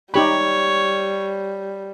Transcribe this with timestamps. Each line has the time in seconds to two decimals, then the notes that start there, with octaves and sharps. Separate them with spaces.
0.14 G3 D#4 G4 C#5 B5